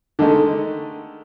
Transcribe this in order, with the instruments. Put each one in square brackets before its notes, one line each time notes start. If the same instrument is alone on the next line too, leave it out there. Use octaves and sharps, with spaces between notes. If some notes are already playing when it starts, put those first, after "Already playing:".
[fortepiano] D3 D#3 G#3 A3